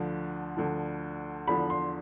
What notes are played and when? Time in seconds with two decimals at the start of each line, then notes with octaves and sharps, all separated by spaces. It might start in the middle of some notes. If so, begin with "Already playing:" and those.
Already playing: D2 D3 F3
0.57 D2 D3 F3
1.47 E2 D3 F3 B5
1.70 C6